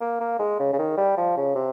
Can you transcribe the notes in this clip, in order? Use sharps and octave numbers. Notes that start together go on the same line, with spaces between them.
A#3
A#3
G#3
C#3
C#3
D#3
G3
F3
C#3
C3